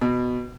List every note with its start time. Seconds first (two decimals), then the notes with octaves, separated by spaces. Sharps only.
0.01 B2